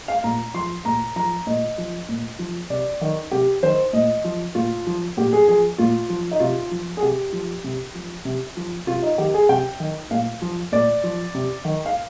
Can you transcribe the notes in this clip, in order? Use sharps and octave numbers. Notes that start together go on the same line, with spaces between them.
F5
A#2 A#5
F3 C6
A#2 A#5
F3 A#5
A#2 D#5
F3
A#2
F3
C3 D5
D#3
C3 G4
D#3 C5
A#2 D#5
F3
A#2 F4
F3
A#2 G4
G#4
F3 G#4
A#2 F4
F3
D#4
C3 F4
F3
G#4
C3 G4
F3
C3
F3
C3
F3
C3 F4
D#4
D#3 G4
G#4
C3 G5
D#3
A#2 F5
F3
A#2 D5
F3
C3
D#3
F5